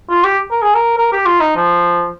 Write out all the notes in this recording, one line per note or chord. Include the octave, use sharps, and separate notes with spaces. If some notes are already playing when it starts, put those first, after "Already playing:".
F4
G4
A#4
G#4
A#4
A#4
G4
F4
D#4
F3